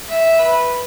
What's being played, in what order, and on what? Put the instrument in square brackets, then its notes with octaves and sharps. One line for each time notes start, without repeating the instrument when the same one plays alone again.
[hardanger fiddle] E5
B4